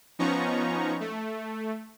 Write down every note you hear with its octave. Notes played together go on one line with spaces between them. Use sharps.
F3 B3 C#4 D#4 A#5 C#6
A3